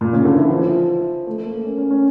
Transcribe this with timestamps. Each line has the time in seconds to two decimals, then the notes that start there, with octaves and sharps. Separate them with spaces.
0.01 A#2
0.13 C#3
0.25 D3
0.38 E3
0.51 F3
1.26 A3
1.46 A#3
1.65 C#4
1.78 C#4
1.91 C#4